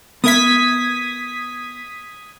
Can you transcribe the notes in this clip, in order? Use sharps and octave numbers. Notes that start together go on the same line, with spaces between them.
B3 A#4 E5 D#6 G#6 B6